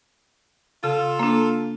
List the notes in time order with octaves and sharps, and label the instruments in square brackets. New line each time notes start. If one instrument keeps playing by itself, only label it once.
[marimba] C#3 [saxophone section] F4 A4
[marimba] A#3 D4